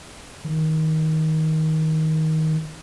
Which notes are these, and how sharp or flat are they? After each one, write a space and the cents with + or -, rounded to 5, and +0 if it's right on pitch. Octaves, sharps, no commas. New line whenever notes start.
D#3 +20